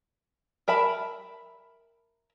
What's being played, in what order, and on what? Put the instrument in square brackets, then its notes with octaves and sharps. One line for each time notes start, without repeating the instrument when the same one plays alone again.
[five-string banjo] A#4 E5 A5 B5